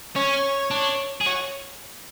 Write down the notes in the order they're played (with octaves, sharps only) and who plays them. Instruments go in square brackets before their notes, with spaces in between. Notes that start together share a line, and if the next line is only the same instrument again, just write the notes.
[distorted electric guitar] C#4 [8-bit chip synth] C#5
[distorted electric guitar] D4
G#4
[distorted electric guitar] F#4 [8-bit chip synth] C#5